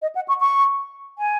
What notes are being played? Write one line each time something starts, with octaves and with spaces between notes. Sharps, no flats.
D#5
F#5
C#6
C#6
G#5